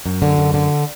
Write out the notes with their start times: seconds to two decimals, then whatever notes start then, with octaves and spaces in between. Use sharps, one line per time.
0.06 F#2
0.22 D3
0.38 F#2
0.54 D3